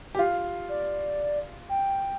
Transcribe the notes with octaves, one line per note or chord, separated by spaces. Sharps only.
G4
F4 F5
D5
G5